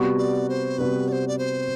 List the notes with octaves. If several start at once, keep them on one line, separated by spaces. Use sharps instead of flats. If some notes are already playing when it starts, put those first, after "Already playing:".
Already playing: C3 G3 B3 F#4
D5
C5
C3 G3 B3 F#4 B4
D5
C5
D5
C5